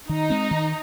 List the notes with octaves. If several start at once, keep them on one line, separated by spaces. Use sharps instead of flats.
D#3 D#4
G#3 C4
D#3